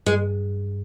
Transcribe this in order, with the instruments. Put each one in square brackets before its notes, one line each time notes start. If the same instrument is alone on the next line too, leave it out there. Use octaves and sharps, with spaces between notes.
[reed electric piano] G2 [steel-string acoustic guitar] G#3